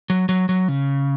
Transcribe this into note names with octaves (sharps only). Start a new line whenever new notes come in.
F#3
F#3
F#3
C#3